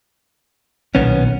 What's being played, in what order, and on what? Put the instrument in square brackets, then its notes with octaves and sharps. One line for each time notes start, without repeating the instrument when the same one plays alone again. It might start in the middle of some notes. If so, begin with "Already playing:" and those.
[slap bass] B1 A#2 D#3 [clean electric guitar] B3 C#4